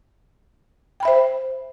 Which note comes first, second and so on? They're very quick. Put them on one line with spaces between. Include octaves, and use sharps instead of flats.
G5 B5 E5 C5